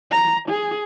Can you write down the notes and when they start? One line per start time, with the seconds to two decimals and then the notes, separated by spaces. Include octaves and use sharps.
0.11 A#5
0.49 G#4